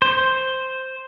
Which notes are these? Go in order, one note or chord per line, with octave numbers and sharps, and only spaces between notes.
C5